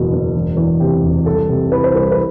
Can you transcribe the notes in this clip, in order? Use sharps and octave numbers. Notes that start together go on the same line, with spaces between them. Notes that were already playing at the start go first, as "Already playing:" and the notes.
Already playing: F#1 E2 B2
F#1
E1
E2
C3 G4
E1
C2 A4
C3
E3 B4
C5
C2 B4
B4